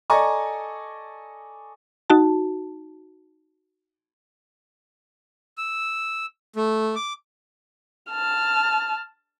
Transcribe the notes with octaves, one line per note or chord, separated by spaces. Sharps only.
A4 D5 D#5 G#5 A#5 C#6
D#4 F#4 A5
E6
A3
D6
A5 F6